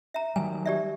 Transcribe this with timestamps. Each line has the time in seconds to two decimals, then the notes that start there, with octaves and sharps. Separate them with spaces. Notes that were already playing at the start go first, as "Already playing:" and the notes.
0.14 E5 A#5
0.36 D#3 F#3 G3 G#5
0.66 G4 D5 E5